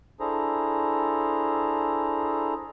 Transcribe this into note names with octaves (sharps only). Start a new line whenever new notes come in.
D4 E4 G#4 A4 C5 A#5